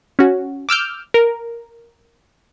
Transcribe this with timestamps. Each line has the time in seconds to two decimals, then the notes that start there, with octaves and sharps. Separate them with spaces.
0.19 C#4 F#4
0.69 D6 E6 F6 G6
1.14 A#4